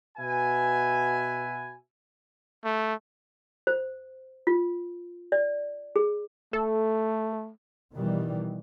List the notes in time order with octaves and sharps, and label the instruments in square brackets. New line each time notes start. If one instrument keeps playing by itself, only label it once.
[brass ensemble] B2 F#4 B4 E5 G#5
[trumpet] A3
[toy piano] C5
F4
D5
G#4
[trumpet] A3 [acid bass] A4
[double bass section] B2 D#3 E3 G3